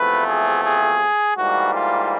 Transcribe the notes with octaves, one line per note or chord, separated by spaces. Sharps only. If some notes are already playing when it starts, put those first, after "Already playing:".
Already playing: E2 C3 F3 A3 B4
G#4
G#4
G#2 E3 G3 A#3 F#4
F4